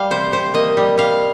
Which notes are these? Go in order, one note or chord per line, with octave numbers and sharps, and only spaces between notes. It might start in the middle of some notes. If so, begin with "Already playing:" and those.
Already playing: G3 F5 G5
C3 C5
C3 C5
A#3 D#5
G3
G3 F5